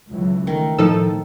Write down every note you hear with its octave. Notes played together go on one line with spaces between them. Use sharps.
C#2 E3 F#3
D#3 A3
A2 F3 D#4 A4